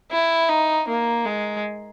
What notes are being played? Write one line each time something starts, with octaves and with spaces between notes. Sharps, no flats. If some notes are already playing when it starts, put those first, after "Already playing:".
E4
D#4
A#3
G#3